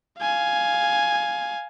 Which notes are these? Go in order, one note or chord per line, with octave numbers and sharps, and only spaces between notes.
F5 G#5